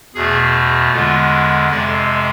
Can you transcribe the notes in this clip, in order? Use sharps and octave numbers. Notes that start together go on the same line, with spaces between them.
E2 B2 A3 G#4
E2 D3 G#3 F4
F2 C3 G#3 D5